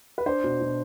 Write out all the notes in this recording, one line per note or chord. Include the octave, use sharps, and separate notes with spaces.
B4
D4 C5
B2
B2